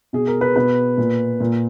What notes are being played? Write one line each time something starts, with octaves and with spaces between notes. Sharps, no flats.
B2 G#4
A#4
B4
B2 B4
A#2
A#2